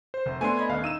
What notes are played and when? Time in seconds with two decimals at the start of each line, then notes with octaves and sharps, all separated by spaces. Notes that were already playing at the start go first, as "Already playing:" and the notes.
0.14 C5
0.26 F1
0.41 A3 B3 D4 G#5 C6
0.57 D#5 B5 G#6
0.69 D#1 F5
0.84 D#4 E6 D#7 E7